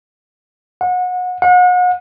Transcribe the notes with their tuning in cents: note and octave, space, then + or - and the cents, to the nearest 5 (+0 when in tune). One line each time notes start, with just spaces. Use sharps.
F#5 -30
F#5 -40